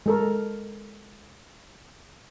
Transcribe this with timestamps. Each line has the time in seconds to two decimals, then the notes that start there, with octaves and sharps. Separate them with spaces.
0.06 G#3 A4 A#4